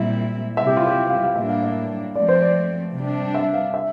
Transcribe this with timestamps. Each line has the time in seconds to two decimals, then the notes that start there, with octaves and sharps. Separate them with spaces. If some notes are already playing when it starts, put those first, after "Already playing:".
Already playing: A#2 G3 C4 E4 E5
0.57 C3 G3 C4 E4 E5
0.67 G4
0.77 F4
0.87 G4
1.09 F5
1.23 F5
1.35 A2 G3 A#3 D4 E5
1.49 F5
1.62 E5
2.15 F3 A3 C4 D5
2.29 C5
2.42 D5
2.94 C3 G3 D4
3.34 E5
3.54 F5
3.74 E5